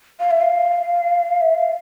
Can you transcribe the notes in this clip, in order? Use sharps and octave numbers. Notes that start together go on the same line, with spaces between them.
F5
E5
F5
E5
F5